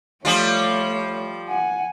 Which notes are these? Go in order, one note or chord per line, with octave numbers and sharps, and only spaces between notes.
F3 G3 A3 F4 C#5
F#5 G#5